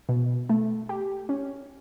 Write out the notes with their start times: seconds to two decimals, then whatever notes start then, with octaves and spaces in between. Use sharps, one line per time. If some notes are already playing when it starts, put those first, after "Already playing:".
0.09 B2
0.49 A3
0.89 G4
1.29 C#4